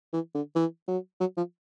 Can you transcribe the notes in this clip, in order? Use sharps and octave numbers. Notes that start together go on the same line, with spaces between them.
E3
D3
E3
F#3
F#3
F3